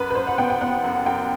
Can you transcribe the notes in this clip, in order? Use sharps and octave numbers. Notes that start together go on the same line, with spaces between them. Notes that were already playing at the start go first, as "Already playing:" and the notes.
Already playing: F#2 B4
B4
F#2 C5
F#5
B3 G5
G5
B3 F#5
F#2 F#5
F#2 G5